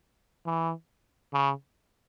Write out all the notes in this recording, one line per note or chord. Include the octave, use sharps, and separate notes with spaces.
E3
C#3